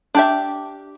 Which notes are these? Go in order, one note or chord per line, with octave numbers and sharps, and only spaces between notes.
D4 G4 E5